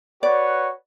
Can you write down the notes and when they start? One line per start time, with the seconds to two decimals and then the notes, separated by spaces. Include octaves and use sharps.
0.23 F#4 B4 C#5 D5